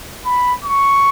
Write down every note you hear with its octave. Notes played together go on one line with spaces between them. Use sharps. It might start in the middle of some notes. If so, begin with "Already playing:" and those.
B5
C#6